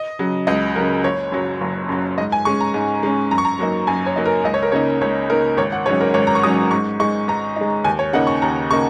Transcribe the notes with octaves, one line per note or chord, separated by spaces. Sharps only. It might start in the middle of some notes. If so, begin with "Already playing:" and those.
Already playing: D#5
C#3 F#3
C#2 D#5
C#3 F#3 A#4
F#1 C#5
F#2 F#3
F#1
F#2 F#3
G#2 D#5
G#5
G#3 C#4 C#6
A#5
G#2
G#3 C#4
F#2 A#5
C#6
A#5
F#3 A#3 D#4
F#2 G#5
C#5
F#3 A#3 D#4
A#4
C#2 D#5
C#5
A#4
C#3 A#3 D#4 C#5
C#2 C#5
C#3 A#3 D#4 A#4
G#1 C#5
F#5
G#2 F#3 C#4 C#5
A#4
G#1 C#5
A#5
C#6
G#2 F#3 C#4 D#6
G#2 C#6
G#3 D#4 C#6
G#2 A#5
G#3 D#4
D#2 G#5
C#5
C#3 A#3 D#4 F#5
C#6
D#2 A#5
C#3 A#3 D#4 C#6